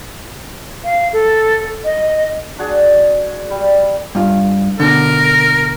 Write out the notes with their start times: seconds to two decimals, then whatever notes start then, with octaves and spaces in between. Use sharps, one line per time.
0.84 F5
1.13 A4
1.85 D#5
2.58 D4 F#4 G#4
3.50 G3
4.15 G2 F4
4.80 B2 D3 A#4